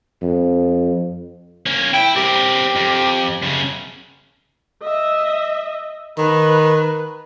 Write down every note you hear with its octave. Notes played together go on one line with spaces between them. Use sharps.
F2
A#3 C#4
E4 G5
C4 G4 A#4
F2
F#2 C#3
D#5 E5
D#3 B4